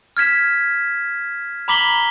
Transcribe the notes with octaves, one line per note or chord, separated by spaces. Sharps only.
F6 G#6 B6 E7
A#5 B5 D6 B6 F#7 G7